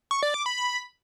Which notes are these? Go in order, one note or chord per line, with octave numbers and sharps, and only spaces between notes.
C#6
D5
D6
B5
B5